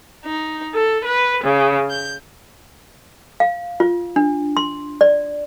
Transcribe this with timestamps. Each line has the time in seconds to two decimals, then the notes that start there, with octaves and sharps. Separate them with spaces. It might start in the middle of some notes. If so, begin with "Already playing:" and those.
0.24 D#4
0.74 A4
1.04 B4
1.45 C#3
1.90 G6
3.40 F5
3.80 F4
4.16 D4
4.57 C6
5.01 D5